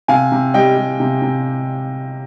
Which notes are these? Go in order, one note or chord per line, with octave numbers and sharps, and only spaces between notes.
C3 F5 G#5
C3
G3 D#5 G5
G3
C3
C3